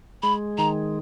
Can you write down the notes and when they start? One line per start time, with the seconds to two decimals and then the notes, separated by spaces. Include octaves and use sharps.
0.22 G#3 B5
0.58 D#3 A#5